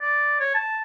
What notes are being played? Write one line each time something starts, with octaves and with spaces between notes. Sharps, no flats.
D5
C#5
A5